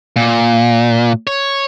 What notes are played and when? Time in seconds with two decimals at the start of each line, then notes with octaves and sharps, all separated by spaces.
0.16 A#2
1.27 C#5